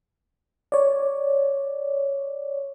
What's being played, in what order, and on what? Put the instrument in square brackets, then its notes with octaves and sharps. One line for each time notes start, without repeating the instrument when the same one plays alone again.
[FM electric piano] C#5 D5